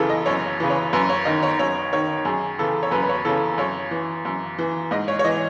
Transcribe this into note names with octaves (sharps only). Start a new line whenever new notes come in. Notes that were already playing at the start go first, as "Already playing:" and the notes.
Already playing: F#2 C#3 E3 G#4 A4
D#5
F#2 C#5
C#3 E3 B4
C#5
F#2 B4
C#5
D#3 D#5
C#5
F#2 C#5
D#3 C#5
F#2 G#4
C#3 E3 A4
C#5
F#2 B4
B4
C#5
C#3 E3 A4
F#2 C#5
E3
F#2
E3
G#2 D#5
C#5
C#5
E3 D#5